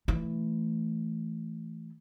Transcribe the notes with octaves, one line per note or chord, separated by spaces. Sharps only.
E3 A3